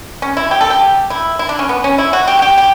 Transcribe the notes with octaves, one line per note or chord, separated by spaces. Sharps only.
C#4
E4
G4
A4
G4
E4
E4
D4
C#4
B3
C#4
E4
F#4
G4
F#4
G4
G4